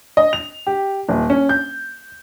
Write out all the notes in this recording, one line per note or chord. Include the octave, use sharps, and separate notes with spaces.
D#5
F7
G4
D#1
C#4
G6